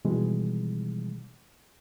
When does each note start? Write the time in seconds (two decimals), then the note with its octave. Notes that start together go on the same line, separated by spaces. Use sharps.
0.05 B2 D#3 E3 G3 G#3